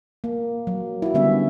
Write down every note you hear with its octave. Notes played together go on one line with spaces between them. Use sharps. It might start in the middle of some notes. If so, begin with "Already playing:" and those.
A#3
F#3
E4 F#4
D3 G3 B3 C#4 E5